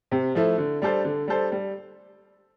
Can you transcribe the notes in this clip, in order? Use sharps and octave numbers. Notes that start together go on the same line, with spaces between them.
C3
F3 A3 E4
D3
G3 D4 A4 C5
D3
G3 D4 A4 C5
G3